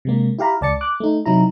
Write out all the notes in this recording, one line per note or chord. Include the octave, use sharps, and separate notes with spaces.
C3 G#3 A#3
E4 G4 F5 A#5 B5
C#2 D5 A5 A6 C#7
D6 F#6
A3 D#4
C3 F#3 D#4 E4 A#5